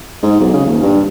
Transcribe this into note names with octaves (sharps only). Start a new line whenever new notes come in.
G#2
B1
C#3
D#1
G2